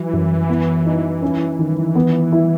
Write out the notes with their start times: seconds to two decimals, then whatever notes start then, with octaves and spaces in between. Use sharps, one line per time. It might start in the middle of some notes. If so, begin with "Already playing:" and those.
Already playing: E3 F#3
0.13 F#2
0.49 B3
0.86 D#4
1.23 C#4
1.59 D#3
1.95 B3
2.32 E4